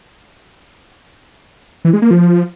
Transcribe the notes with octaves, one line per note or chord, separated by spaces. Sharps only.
E3
G#3
A#3
F3